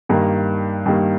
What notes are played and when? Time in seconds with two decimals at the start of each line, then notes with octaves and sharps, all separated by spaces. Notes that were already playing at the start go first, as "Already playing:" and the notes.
0.09 G2 D#3 G3 A#3
0.86 G2 D#3 G3 A#3